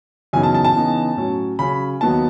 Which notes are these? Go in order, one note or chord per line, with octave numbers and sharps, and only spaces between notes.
F#2 C#3 E3 B3 D#4 G#5
A5
A5
A5
C#3 E3 B3 D#4
A2 F#3 C#4
C#3 F#3 C#4 B5
D#2 D#3 F#3 B3 D#4 A5